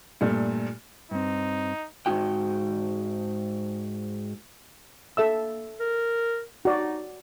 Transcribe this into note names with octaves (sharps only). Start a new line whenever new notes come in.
G2 A#2 A3
G2 C4 D#4
G#2 G#3 D#4 F#4 G5
A#3 A4 E5 E6
A#4
D#4 F#4 D5